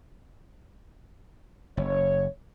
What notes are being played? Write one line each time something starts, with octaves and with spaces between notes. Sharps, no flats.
F#1 C#5